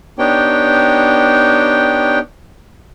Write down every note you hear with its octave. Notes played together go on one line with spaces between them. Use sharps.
B3 D4 D#4 G4 C#5 G5